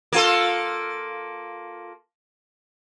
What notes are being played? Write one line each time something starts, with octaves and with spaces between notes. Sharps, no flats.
A#3 F4 A4